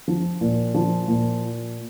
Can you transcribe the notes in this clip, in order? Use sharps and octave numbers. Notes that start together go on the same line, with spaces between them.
F3
A#2
F3
A#2